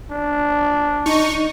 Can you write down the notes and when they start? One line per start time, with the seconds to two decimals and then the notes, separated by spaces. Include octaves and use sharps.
0.11 D4
1.06 D#4 C#6